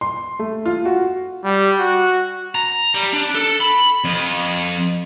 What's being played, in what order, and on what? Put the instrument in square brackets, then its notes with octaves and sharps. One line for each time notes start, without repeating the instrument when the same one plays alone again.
[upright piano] C6
A3
F4
F#4
[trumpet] G3
F#4
[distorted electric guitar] A#5
G3
D4
A4
B5
F2